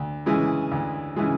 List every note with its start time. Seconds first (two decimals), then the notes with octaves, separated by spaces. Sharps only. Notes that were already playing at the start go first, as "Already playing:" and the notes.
Already playing: D2
0.26 C#3 E3 G#3
0.72 D2
1.16 C#3 E3 G#3